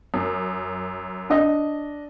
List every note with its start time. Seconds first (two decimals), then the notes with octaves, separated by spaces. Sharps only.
0.14 F#2
1.30 D4 D#5